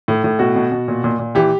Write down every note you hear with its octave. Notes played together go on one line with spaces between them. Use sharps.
A2
A2
B2 F#4
B2
B2
A#2
A#2
A#2
E3 G4